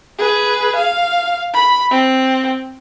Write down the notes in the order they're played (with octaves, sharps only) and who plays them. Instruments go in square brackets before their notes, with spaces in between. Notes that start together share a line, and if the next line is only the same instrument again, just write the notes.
[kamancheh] G#4 B4
F5
B5
C4